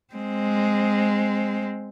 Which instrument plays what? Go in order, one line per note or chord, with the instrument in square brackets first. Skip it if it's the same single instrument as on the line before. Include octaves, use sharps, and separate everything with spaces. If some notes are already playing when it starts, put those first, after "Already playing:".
[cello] G#3 C4